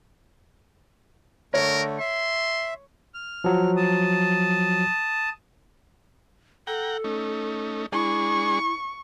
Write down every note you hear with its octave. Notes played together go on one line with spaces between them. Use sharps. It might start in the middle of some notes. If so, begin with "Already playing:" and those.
D3 A3 A#4 C#5
E5 C6
F6
F3 F#3
A5 D#6
A4 F#5 G5 A#5
A3 C#4 D#4
G#3 D4 E4 G#4 C#6